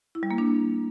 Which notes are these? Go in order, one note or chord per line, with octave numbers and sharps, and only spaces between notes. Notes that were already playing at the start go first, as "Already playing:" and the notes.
E4
G3
A#3
D4